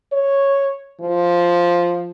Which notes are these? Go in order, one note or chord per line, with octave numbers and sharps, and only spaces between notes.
C#5
F3